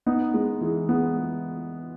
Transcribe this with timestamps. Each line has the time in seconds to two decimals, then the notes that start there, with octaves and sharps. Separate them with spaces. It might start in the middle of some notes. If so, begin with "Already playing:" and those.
0.06 B3 D#4
0.34 G#3 B3
0.61 E3 G#3
0.89 G#3 B3